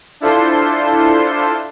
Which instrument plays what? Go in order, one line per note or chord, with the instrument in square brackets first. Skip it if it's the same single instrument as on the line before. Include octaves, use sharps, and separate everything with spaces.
[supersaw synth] D4 E4 F4 A4 C5 C6